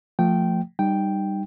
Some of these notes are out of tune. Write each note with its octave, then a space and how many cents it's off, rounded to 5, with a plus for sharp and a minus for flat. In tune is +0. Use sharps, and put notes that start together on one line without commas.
F3 +10 A3 +25 G5 -10
G3 +5 D#4 -20 G5 +0